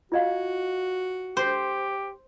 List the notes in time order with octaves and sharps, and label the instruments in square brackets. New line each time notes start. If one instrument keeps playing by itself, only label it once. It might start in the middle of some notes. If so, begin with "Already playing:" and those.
[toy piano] F4 D#5 F5 [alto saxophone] F#4
[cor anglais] G4 [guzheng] C5